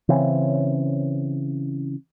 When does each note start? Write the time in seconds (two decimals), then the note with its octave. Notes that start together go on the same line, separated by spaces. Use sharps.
0.09 C#3 E3 C4 C#4